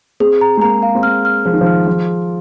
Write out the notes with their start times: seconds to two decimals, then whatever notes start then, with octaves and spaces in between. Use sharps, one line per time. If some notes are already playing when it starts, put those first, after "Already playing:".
0.20 C4 G#4
0.41 A#5
0.57 G#3
0.61 A#3 A#5
0.82 F5
0.95 C4
1.03 A#3 F6
1.25 F6
1.45 F3 G#4
1.53 D#3
1.61 F3
1.66 F6
1.86 F3 G#4
2.07 G#4